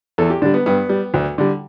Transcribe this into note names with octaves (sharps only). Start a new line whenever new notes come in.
E2 A4
G4
D3 G3 D4
B3
G2 B3
G3
D2
D3 G3